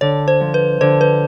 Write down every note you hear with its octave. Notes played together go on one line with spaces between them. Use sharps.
D3 C#5
C5
F3
B4
D3 C5
B4